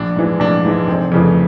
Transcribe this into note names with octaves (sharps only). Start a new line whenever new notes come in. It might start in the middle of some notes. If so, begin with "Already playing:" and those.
Already playing: A#1 D4
G#2 E3 G#3
A#1 D4
G#2 E3 G#3
F1 C4
F2 C#3 E3 A3